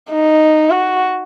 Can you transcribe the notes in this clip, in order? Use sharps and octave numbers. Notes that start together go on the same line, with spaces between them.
D#4
F#4